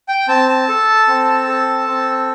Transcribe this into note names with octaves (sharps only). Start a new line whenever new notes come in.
G5
C4 A5
A5
A4
C4
A4
C4